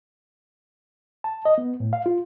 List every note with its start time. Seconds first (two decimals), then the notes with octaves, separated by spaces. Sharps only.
1.24 A5
1.45 D#5
1.58 B3
1.80 A2
1.93 F5
2.06 F4